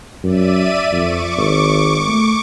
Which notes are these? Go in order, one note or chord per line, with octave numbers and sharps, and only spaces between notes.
F#2 D5 E5 D#7
F2 C#6 D6
G#1
A3